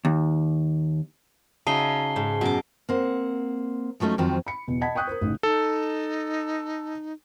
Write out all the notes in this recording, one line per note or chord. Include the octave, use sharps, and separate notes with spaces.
D#2
C#3 D#4 F#4 E5 A5 C7 G7
G#2
F#2 B2 D6
A#3 C4 F#5
F3 F#3 A3 C#4 D#4
F2 D#3 F#3 C4 F4 C5
B5 C#7
E2 B2
D#5 F#5 A5 B5 G#6 B6
G5 C#6 D#6 F#6 G6
A#4 C5
A1 C#3 D#4
D#4 A4